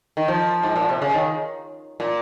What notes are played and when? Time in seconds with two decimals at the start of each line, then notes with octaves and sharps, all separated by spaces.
0.17 D#3
0.28 F3
0.63 G#2
0.76 A#2
0.89 C3
1.02 C#3
1.13 D#3
2.00 A#2